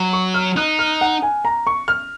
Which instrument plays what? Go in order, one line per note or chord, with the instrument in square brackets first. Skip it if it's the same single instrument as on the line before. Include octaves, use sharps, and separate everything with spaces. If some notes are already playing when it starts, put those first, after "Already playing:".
Already playing: [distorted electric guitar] F#3
[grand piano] C#6
F6
[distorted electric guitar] D#4 [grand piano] F#6
[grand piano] F6
F#5
G#5
A#5
C#6
F6